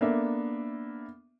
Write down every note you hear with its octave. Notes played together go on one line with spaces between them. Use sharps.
A#3 B3 D4 A4 E5